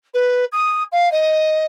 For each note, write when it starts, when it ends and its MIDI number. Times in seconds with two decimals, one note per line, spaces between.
0.14 0.45 71
0.52 0.83 87
0.92 1.11 77
1.11 1.65 75